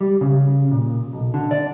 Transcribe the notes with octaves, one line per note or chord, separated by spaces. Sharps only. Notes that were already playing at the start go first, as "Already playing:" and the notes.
G3
C#3
A#2
B1
D3
D5